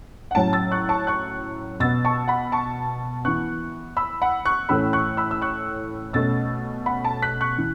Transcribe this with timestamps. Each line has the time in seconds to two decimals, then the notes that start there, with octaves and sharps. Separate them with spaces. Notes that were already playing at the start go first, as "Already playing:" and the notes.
0.31 F#5
0.35 A2 F#3 C#4 A5
0.53 E6 A6
0.71 C#6 F#6
0.89 A5 C#6
1.07 C#6 F#6
1.80 B2 B3 E6 A6
2.05 A5 C#6
2.28 F#5 B5
2.52 A5 C#6
3.25 E3 B3 C#6 F#6
3.97 B5 E6
4.22 F#5 B5
4.45 C#6 F#6
4.69 A2 E3 A3 C#4 B5 E6
4.93 C#6 F#6
5.17 B5 E6
5.31 E6
5.42 C#6 F#6
6.13 B2 A3 C#4 E6 A6
6.86 F#5 B5
7.04 A5
7.22 F#6 B6
7.41 C#6 F#6
7.58 E3